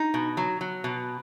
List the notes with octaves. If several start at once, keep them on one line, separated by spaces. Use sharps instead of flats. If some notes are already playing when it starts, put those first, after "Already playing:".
Already playing: D#4
B2
F#3
F#3
B2